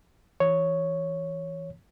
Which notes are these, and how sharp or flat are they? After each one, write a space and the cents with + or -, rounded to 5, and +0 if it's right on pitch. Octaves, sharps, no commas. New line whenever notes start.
E3 +0 C#5 +0